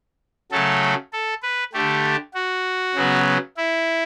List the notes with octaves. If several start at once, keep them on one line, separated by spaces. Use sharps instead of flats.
C#3 F#3 A3 A4
A4
B4
D3 A3 G4
F#4
C#3 F#3 B3
E4